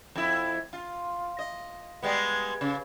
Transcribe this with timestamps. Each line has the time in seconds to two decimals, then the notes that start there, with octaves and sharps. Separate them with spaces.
0.15 F2 E4
0.73 F4
1.39 D#5
2.03 G3 G#3 B3
2.61 C#3